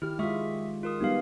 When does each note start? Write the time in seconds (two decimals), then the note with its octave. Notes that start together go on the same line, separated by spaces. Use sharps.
0.02 D#3 E4 G4 F6
0.19 G#3 F4 E5 C#6 D#6
0.83 F4 A#4 D#6
1.00 G3 B3 D#4 G4 F5